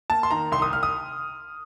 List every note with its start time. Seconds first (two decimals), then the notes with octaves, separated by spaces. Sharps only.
0.10 A#3 A5
0.23 C6
0.31 D#3 A#5
0.52 C2 C6
0.62 D#6
0.73 C2 F6
0.83 D#6